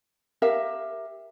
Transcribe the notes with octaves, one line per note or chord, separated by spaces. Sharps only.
G4 A#4 E5 F5